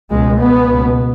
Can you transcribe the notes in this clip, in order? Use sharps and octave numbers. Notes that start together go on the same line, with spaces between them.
C#2 B2 G#3
B3
C#2 B2